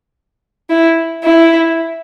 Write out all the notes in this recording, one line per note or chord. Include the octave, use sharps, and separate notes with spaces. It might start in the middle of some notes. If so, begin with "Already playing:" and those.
E4
E4